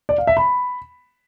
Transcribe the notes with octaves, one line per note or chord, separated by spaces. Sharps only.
D5
F5
E5
B5